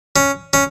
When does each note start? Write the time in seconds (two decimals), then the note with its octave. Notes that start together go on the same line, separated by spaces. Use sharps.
0.16 C#4
0.53 C#4